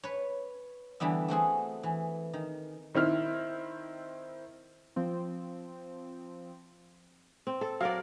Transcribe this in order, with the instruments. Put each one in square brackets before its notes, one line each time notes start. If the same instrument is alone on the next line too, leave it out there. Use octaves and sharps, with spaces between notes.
[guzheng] B4 C#5
D3 E3 G3 B3 E5
A3 C4 F#4 G#4
E3
D#3
[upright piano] D#3 C4 E4 F6
[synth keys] F3 C4
[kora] C4
A4
[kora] F#3 A#4 D5 [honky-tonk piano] F5